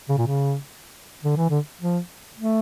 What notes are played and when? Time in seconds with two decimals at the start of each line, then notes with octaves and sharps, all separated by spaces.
0.09 C#3
0.18 A#2
0.26 C#3
1.23 D3
1.37 E3
1.50 D3
1.81 F3
2.39 A3